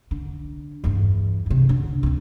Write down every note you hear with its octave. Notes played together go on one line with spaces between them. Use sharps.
D3
E2 G2
E2 C3
D3
D2 C4